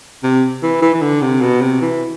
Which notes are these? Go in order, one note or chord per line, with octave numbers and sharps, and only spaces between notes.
C3
E3
E3
E3
D3
C3
B2
C3
E3